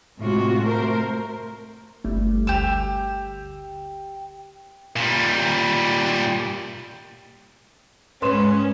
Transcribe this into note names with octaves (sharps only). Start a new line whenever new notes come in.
A2 C3 G#3 F4 F#4
A3 A#4 C5
G1 G3 A3
D2 G4 E6
A#2 G3
G#2 G#3 C#4 D#4 B4 C6 E7